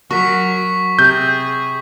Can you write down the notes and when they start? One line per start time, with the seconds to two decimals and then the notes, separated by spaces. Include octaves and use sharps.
0.11 F#3 F#4 A#4 C#6 B6
0.99 C3 G#4 G6